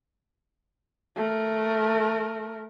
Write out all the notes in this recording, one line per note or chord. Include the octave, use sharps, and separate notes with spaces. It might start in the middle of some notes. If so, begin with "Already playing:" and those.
A3 A#4